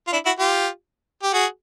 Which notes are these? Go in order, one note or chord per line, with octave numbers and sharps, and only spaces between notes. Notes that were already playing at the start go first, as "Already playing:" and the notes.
F4
D4 E4
E4 F#4
F4 G4
G4
F#4 G#4